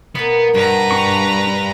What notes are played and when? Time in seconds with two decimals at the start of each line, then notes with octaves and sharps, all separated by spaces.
0.15 B2 A#3 B3
0.54 G2 F#4 B4 A#5
0.91 D4 C#6